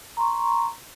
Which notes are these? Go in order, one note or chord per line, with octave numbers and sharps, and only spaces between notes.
A#5 C6 C#6